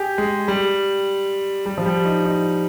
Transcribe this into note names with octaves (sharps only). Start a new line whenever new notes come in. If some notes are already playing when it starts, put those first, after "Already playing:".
Already playing: G4 G#4
G#3
G3
G3
F3
G3
D#4
D#4